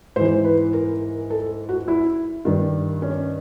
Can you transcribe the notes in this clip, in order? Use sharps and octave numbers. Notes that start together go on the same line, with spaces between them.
G#2 E3 C5
B4
A#4
A4
F#4
E4
G2 D#3
C#4